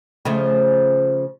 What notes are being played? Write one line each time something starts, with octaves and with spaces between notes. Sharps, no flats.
C#3 F3 A3